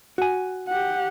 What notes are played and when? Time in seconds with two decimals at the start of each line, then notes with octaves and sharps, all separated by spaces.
0.18 F#4 G#5
0.67 G4 F#5